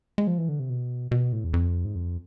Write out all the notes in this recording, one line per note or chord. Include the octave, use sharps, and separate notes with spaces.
G#3
F3
E3
D3
C3
B2
B2
A2
E2
F2
G#2
F2